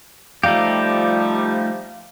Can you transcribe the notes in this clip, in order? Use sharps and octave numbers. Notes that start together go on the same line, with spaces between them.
F3 G3 A3 D#4 G4 F5